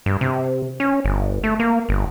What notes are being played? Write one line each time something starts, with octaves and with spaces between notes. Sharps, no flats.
G2
C3
C#4
G1
A3
A#3
G1